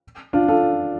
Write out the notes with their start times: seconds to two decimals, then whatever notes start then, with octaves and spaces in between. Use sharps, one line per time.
0.33 D4 F4
0.48 F4 A4